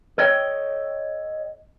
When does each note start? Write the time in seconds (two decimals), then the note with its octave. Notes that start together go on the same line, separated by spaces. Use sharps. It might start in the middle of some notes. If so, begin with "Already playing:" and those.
0.18 A4 C#5 D#5 G5